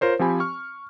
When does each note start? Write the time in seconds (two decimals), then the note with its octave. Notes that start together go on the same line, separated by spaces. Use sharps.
0.01 F4 A#4 C5 C#5
0.19 F3 C4 G4 G#5 B5
0.40 C#6 F6